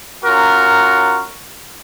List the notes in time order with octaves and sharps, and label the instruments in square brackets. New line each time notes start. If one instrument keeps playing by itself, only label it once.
[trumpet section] C#4 F4 F#4 A#4 A#5 C#6